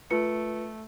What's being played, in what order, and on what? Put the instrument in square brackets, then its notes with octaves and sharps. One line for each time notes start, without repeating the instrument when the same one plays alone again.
[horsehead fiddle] A3 [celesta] F4 B4 C#7